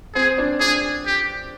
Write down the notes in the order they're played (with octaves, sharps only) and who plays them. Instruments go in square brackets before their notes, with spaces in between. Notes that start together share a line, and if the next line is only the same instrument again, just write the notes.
[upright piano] C4 [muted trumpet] G#4
[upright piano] D4
[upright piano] D4 [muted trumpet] G#4
[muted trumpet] G4